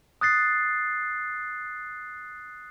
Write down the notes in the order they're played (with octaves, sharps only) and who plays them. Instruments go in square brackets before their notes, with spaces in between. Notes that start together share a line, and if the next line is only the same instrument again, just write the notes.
[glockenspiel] D#6 F#6 A6 C7